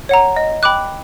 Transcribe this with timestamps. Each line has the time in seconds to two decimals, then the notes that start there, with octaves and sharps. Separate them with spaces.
0.09 C#5 F#5 A#5
0.36 D#5
0.63 G5 B5 D6 F#6